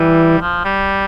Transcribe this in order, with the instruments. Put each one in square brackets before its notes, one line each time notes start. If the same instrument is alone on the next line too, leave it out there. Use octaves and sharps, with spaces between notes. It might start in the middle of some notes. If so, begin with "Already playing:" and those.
Already playing: [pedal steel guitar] E3 [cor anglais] G3
[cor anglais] F3
G3